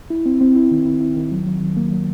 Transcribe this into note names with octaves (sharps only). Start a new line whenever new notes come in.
E4
C4
C4
E4
D#3
E4
E4
D#3
F#3
F#3
D#3
A#3
F#3